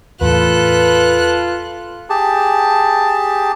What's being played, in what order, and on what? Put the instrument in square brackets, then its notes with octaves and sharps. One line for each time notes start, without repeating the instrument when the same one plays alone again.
[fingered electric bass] E2 A2 [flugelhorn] F4 [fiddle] A4 F#6 [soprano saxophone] B4
[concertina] G4 G#4 A5